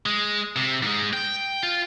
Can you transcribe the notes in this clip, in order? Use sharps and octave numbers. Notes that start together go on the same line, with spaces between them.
G#3
C3
G#2 G#3
G5
F4